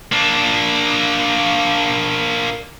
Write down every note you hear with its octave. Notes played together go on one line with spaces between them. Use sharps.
A#3 D4